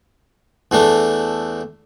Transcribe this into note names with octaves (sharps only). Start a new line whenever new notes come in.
E2 E3 A3 D4